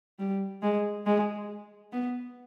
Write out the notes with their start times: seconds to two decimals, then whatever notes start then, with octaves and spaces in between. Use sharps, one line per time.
0.19 G3
0.62 G#3
1.06 G#3
1.92 B3